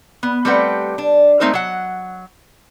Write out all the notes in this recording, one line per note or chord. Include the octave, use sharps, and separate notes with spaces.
B3
G3 A3 C4 G4 B4 F#5
D4
G#3 A3 C4 D#4 A#4 C5
F#3 F#5